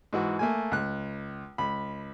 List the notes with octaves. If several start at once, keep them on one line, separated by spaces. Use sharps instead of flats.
G#2 E3 F#4
A3 A#3 G#5
C#2 F#6
C#2 B5